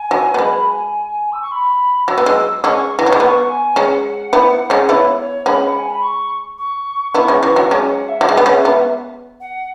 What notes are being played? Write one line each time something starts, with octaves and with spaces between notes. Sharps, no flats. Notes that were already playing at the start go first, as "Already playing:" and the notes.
Already playing: G#5
F#3
B3
G#3 B5
G#5
E6
C#6
B5
F#3 E6
B3
G#3
G#3 C#4 C#6
E3
F#3
G#3
B3 C#6
G#5
G#3 C#4 F#5
B3 E4
G#3 C#4
B3 E4 C#5
C#5
G#3 C#4 B5
F#5
G#5
B5
C#6
C#6
B3 E4 C#6
G#3 C#4
E3
F#3
G#3 C#4 G#5
G#5
F#5
E5
F#3
G#3
B3
G#3 C#4
E5
B3
F#5